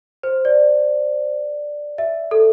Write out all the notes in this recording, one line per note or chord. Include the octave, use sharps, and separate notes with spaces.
C5
D5
E5
A4